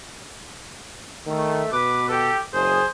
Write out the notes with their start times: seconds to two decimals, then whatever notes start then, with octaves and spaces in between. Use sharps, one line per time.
1.27 D#3 A3
1.72 B2 B4 D6
2.09 G4 A4
2.54 F#1 G#4 C5